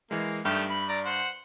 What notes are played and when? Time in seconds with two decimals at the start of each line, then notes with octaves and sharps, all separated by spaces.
0.11 E3 G#3 A#3
0.45 G2 D#3 A3 G4 E5 F6
0.69 B5
0.89 D5 A#5
1.05 C5 F#5